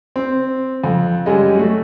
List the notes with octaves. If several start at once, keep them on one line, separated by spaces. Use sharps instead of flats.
C4
F2
F#2 G3 G#3 D#5
A3 F#4